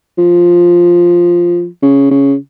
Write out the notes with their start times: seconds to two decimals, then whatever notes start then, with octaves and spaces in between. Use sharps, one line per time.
0.18 F3
1.82 C#3
2.11 C#3